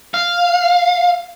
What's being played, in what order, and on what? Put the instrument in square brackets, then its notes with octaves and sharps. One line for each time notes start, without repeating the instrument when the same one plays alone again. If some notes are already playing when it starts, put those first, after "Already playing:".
[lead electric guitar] F5